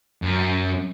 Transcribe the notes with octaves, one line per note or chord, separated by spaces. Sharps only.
F#2